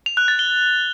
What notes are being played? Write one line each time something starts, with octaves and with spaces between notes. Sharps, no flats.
F7
F#6
A6
G7